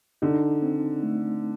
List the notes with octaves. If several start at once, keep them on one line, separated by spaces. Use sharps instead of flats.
D3 D#4
C4
A3